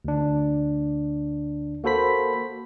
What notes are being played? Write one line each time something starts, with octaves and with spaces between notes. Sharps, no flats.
D2 D4
A#3 F#4 A4 C5 B5 B6